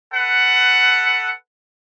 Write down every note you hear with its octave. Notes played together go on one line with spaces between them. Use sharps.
A4 B4 F#5